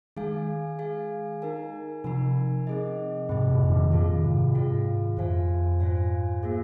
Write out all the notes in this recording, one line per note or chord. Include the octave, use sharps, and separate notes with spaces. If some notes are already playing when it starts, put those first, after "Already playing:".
D#3 G#3 G#4 F5 G#5
G#4 F5 G#5
D#4 A#4 G#5
C3 F3 D#4 A#4 G#5
C4 G#4 D#5
G#2 C3 C4 G#4 D#5
F2 A#2
A#2 D#3
A#2 D#3 F4 G#4 F5
G#2 C3
G#2 F4 G#4 F5
F2 F4 C5 F5 G#5
G#2 F4 C5 F5 G#5
A#3 F4 G#4